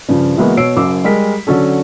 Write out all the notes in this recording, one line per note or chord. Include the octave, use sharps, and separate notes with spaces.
G2 C#3 F3
E3 F#3 G#3 A#3 B3 F#4
B2 C#5 E6 C7 D7
F#1 F#2 D6 E6
G3 G#3 A#4 B6
D3 F#3 C#4 A4